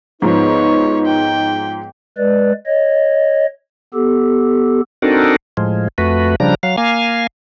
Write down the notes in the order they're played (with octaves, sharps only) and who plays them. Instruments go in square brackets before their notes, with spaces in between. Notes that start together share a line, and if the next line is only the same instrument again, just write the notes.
[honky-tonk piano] G#2 F3 [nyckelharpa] B3 C#5 [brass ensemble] D#4
[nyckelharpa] G5
[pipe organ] G#3 B4 D5
C#5 D#5
B3 G4 A4
[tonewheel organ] C4 D4 D#4 F#4 A4 A#4
A2 F3 G#3
F2 A3 F#4 B4
C#3 F3 G3 D4 A#5
F#3 F5
A#3 F5 G#5